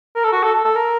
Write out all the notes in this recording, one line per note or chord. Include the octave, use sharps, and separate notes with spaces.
A#4
A4
F#4
A4
A4
A4
A#4